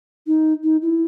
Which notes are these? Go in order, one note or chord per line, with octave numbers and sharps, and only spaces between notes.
D#4
D#4
E4